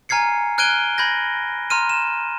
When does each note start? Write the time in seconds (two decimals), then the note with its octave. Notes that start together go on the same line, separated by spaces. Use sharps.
0.09 G#5 A#5 F6 G#6 C7 C#7
0.58 F6 F#6 G#6 D7 D#7 G7
0.98 B5 G6 G#6 A#6
1.70 A#5 C6 F6 D#7
1.89 E7